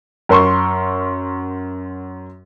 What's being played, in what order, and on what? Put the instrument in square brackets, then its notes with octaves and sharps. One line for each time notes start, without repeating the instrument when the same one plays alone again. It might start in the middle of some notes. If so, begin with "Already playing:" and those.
[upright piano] F#2 A#4 C6 C#6